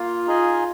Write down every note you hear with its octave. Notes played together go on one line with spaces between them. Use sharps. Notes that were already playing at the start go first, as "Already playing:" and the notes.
Already playing: A#3 F4
D#4 G#4 D#5 G#5